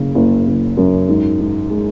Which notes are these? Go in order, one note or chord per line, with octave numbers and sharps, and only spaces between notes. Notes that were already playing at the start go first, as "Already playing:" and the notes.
Already playing: F#1 C#3
F#1
F#1
F#2
G#2
G#2
G#3